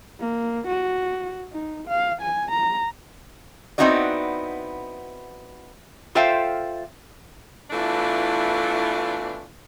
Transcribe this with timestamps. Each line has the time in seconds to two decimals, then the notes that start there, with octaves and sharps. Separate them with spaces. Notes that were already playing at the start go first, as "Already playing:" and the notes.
0.20 A#3
0.67 F#4
1.52 D#4
1.88 F5
2.21 G#5
2.51 A#5
3.78 B3 C4 D#4 E4 F#4 D5
6.15 F4 A4 C5 E5 F5 G5
7.71 B2 E3 A3 D4 E4 F4